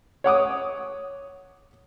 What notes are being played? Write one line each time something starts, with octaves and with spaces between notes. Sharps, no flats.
C#5 F#5 D6 D#6